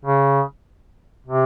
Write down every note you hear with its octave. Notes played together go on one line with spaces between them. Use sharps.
C#3
C3